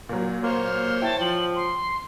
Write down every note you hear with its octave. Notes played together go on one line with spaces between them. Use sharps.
A#2 F#3
A#3 C5 C#5 C6 F6
E4 G5 A5
F3 F#7
C6